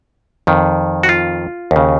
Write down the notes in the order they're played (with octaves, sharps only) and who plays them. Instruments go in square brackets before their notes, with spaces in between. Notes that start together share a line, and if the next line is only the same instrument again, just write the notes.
[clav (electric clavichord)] F2 D#3
F#4
F4
D#2 C#3